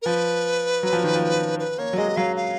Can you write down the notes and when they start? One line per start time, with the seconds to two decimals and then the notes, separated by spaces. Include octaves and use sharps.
0.02 A#4
0.06 F3 B4
0.83 F#3
0.93 F3
1.03 D#3
1.15 F3
1.59 B4
1.78 A#3 C#5
1.93 F#3
1.98 G#3 D#5
2.08 G#3
2.17 F#3 F5
2.36 F5